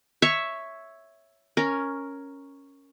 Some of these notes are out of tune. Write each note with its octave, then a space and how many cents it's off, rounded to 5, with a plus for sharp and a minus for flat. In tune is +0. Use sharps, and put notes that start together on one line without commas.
C#5 +0 E5 +0 C#6 +0
C#4 +0 A#4 +0